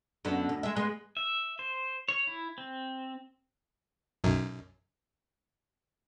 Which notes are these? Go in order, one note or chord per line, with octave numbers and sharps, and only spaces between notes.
F#2 D3 B3
D2
G#3 E5
G#3 B3
E5
C5
C#5
E4
C4
B1 F#2